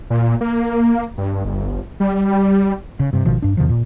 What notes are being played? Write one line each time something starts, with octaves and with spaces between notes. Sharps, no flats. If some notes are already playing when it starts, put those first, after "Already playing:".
A#2
A#3
G2
G1
G3
C#3
G2 C3
G#1 B2 D#3 F3
G2 D4
E2 C3 D#3 F3
A#2